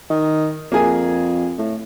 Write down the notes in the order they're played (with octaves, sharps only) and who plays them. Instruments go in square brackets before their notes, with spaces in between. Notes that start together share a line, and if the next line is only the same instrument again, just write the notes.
[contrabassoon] D#3
[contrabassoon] F2 [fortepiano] A#3 G#4 G#5
[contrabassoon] A2